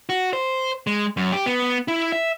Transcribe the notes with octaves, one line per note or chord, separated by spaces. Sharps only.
F#4
C5
G#3
F#2
G4
B3
E4
E5